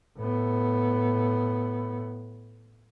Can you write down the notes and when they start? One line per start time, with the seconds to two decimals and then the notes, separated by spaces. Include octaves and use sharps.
0.18 A2 B3